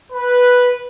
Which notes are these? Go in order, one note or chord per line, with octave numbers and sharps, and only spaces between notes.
B4